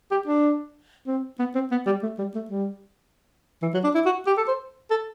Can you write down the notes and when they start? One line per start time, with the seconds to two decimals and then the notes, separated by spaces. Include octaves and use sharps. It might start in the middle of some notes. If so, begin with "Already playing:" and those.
0.11 G4
0.27 D4
1.07 C4
1.39 B3
1.55 C4
1.71 B3
1.86 G3
2.03 A3
2.18 G3
2.35 A3
2.50 G3
3.62 E3
3.74 F#3
3.84 D4
3.95 E4
4.06 F#4
4.27 G4
4.37 A4
4.48 C5
4.91 A4